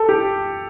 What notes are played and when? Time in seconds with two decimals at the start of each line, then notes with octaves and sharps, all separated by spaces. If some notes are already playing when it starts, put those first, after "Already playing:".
Already playing: A4
0.09 G4